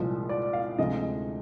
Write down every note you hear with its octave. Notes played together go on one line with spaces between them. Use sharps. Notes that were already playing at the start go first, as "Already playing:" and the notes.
Already playing: C2 A#2 F3 G#3
D5
F5
D2 C3 F3 G#3 D#5